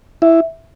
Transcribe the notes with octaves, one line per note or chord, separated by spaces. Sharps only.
E4 E5